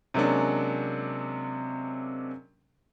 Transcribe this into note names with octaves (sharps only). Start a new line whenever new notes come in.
C3 F#3 G#3 A#3 C#4 D4